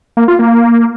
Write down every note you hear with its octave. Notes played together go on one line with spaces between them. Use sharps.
A#3
F4
A#3